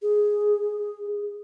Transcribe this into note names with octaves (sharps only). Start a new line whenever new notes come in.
G#4